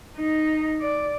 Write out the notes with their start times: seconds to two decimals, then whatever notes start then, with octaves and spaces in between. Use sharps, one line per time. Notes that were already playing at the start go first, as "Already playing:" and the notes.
0.17 D#4
0.81 D5